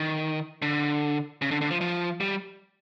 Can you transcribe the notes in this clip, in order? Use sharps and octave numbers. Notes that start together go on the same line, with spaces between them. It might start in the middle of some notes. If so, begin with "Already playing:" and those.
Already playing: D#3
D3
C#3
D3
D3
F3
F3
G3